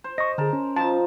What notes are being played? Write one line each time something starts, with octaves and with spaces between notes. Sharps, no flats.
C5
D#5 C#6 A#6
D3 G#4 A#4 A5
C#4
F3 D#4 A5